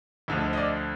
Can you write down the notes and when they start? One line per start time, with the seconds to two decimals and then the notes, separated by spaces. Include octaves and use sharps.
0.28 D2 D3 F3 D#5
0.53 D#5
0.57 D5